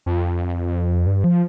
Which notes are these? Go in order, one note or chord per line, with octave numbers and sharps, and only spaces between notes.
F2
G2
F3